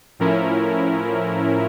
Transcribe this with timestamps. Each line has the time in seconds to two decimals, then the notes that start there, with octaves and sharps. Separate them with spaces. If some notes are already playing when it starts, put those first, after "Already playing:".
0.19 A2 F3 C#4 E4 A#4